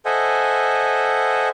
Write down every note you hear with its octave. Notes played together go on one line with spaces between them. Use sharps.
A4 C5 D#5 E5 F#5 G#5